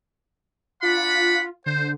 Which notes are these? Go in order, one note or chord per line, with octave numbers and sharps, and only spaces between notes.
D4 F4 F#5 B5
D3 C5